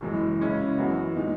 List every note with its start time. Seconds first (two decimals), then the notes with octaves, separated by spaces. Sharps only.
0.01 F#1 F#2 E3 G#3
0.40 C#3 G#3 C#4 E4
0.77 F#2 E3 B3 F#4
1.16 A#2 G#3 D#4